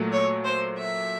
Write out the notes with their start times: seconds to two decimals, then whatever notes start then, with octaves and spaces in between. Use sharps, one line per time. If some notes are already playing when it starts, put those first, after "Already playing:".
Already playing: A#2 F#3 A3
0.12 C#5
0.44 C5
0.77 E5